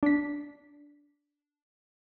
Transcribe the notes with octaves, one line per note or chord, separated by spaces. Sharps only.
D4 B6